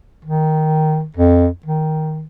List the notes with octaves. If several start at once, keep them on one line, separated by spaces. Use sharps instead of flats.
D#3
F2
D#3